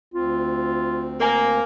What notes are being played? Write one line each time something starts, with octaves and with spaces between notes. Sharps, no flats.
D2 C4 F4
A#3 A#4 G#5